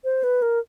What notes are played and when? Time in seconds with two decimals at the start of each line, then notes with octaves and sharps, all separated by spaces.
0.04 C5
0.24 B4
0.42 A#4